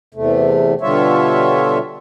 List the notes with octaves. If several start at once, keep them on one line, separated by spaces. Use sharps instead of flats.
E2 C3 A3
B2 D3 G3 F4 C#5 E5